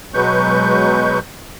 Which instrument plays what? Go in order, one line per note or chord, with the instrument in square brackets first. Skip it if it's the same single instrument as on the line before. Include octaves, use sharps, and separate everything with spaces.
[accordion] B2 F#3 G#3 B4 C#6 G6